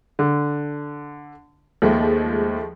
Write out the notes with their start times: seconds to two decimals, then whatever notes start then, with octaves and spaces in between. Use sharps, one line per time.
0.19 D3
1.82 D#2 F3 G#3 A3